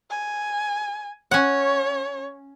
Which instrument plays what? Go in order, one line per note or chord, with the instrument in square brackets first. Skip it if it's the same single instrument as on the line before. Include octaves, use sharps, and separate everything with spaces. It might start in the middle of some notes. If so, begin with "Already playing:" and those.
[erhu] G#5
[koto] C#4 F#5 [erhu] C#5